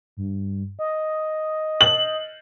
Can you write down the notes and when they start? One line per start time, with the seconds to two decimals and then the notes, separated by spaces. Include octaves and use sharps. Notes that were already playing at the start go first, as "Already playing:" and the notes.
0.17 G2
0.79 D#5
1.81 F#7